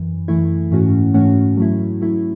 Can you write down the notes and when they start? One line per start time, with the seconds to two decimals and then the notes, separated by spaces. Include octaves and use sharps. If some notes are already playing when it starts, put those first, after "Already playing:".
Already playing: F#2 E3
0.28 F#2 E3 A3 E4
0.71 G#2 E3 A3 C#4 F#4
1.14 G#2 E3 A3 C#4 F#4
1.57 F#3 A3 E4
2.01 F#3 A3 E4